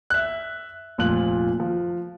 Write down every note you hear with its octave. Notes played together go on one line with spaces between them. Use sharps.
E5 F#6
F1 A#2 F3 F4 F#6 F#7
F3